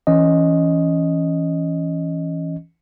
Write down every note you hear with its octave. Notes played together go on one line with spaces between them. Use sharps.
E3 C#4 D#5